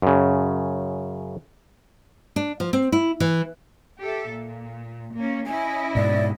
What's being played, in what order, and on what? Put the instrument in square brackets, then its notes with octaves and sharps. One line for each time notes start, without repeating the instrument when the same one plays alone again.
[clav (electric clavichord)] F#2 C#3
[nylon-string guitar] D4
F3
C4
E4
E3
[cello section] G4 A4 E5
A#2
A#3 C#4
[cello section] C#4 E4 D#5 [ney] G#5
[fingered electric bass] G#2 B2 [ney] D5